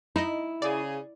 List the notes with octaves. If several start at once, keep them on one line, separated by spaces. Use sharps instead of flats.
D#4 E4 D#5
C#3 G#4 D5